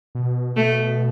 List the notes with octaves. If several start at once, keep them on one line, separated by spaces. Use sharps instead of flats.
B2
B2 A3